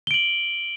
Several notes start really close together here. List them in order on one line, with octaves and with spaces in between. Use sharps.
G7 D7 F#7